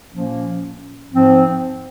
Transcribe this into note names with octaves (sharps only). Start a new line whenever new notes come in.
A#2 F3 A#3 C#4
G#2 F3 C4